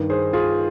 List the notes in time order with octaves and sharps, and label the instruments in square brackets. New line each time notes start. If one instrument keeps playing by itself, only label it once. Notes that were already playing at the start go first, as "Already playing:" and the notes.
Already playing: [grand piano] G2 D#3
G#4 C5
F4 G#4